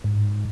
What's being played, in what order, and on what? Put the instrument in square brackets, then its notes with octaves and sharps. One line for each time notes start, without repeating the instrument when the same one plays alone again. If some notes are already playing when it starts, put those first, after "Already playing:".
[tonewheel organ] G#2